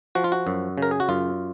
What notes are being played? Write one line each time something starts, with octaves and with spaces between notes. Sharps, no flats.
F3 F#4
F4
F#4
F#2
C#3 A#4
G#4
F#4
F#2 F4